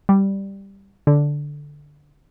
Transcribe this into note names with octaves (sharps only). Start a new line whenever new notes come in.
G3
D3